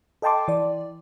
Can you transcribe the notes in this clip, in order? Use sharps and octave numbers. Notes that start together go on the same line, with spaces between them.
A4 D#5 G5 A5 C6 D6
E3 D5